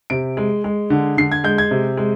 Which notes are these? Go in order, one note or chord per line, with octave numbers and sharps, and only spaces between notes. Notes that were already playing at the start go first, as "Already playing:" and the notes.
C3 D7
G#3
G#3
D3
D3 C7
G#6
G#3 G6
G#6
C3
G#3